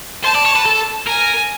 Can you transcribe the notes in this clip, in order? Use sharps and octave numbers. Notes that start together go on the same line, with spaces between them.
C5 A5
D5
C#5
B4
A4
A#4 G#5